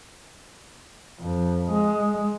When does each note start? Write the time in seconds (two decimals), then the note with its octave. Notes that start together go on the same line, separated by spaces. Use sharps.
1.19 F2
1.70 G#3